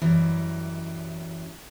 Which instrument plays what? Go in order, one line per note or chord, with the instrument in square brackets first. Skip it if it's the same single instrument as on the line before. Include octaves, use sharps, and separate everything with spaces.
[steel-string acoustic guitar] F#2 E3 G3 D#5